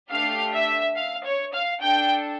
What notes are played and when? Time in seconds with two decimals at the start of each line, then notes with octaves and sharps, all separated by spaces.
0.10 A3 D4 G4 F5
0.53 E5
0.96 F5
1.24 C#5
1.53 F5
1.81 D4 A4 G5